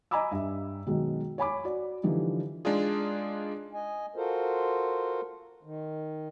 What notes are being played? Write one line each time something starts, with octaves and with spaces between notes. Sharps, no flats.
D#5 G#5 A#5 B5 D6 E6
G2 E5
B2 D#3 F#3 G#3
C#5 G#5 B5 D6
F#4 D5
D3 E3 F3 G3 D#4
G#3 D4 D#4 F4 G#4
D#5 G#5
F4 F#4 A4 A#4 C5
D#3